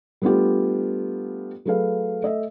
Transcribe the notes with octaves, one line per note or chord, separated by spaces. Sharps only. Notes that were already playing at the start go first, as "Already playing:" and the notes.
G3 A3 B3 D4 F4 G4
F#3 A3 G#4 A4 B4 F5
A3 D#5 E5